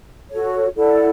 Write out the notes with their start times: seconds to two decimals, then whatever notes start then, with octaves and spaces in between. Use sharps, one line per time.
0.31 F#4 A4 C#5
0.75 E4 A4 D5 F#5